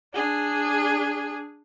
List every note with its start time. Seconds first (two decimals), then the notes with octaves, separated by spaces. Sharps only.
0.14 D4 G#4